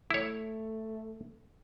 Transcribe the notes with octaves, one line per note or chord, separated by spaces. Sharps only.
A3 E4 C#5